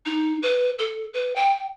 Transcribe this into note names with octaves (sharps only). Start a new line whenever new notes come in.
D#4
B4
A4
B4
G5